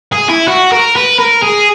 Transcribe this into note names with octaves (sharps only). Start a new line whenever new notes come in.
G#4
E4
F#4
A#4
B4
A#4
G#4